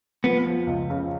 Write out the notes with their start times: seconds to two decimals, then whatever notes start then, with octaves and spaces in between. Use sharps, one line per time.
0.24 F3 B3
0.46 F3
0.67 C#2
0.90 C#3